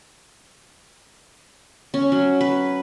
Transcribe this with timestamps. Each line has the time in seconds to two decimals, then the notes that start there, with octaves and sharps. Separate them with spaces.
1.94 C#4
2.12 F#3
2.41 B4